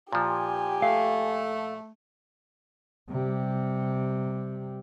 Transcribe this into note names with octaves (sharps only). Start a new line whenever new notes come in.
A#2 F3 G4 G#5
A3 F5
C3 G3